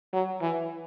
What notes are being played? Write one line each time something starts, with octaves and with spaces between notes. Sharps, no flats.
F#3
E3